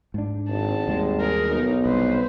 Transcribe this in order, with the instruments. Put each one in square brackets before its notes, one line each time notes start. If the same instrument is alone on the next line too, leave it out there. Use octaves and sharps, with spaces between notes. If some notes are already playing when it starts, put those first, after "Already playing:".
[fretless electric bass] G#2 D4
[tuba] G#1 [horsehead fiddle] A5
[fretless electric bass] D#2 G3 G#3
[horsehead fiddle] G#4 A#4
[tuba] B1 [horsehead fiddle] D#4
[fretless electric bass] C2 [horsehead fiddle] B4 C5